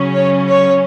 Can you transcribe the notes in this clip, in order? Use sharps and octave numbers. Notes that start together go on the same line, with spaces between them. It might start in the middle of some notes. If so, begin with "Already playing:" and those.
Already playing: C#3 F#3 C#4
C#5
C#5